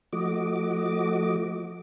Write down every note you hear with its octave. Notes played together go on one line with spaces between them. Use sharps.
F3 A3 F#4 D#5 D6